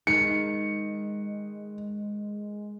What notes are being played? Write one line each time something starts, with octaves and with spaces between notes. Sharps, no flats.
D#3 G#3 C#7